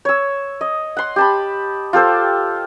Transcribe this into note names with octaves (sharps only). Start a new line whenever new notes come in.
C#5 E6
D#5
F#5 C6
G4 A5 B5
F4 G4 A4 C5